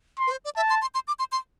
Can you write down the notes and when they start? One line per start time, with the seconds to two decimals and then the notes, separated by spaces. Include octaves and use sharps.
0.19 C6
0.27 B4
0.31 C5
0.45 D5
0.56 E5 A5
0.70 C6
0.81 C6
0.94 C6
1.07 D6
1.19 C6
1.32 C6